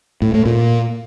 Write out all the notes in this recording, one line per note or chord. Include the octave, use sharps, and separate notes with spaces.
A2
A2
A#2